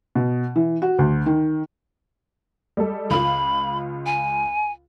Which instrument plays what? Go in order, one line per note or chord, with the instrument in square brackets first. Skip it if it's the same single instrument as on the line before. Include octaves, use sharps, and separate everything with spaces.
[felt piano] B2
E3
F#4
D2
D#3
[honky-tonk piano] G3 G#3 A4
[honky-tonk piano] C#2 F4 [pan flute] B5
[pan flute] G#5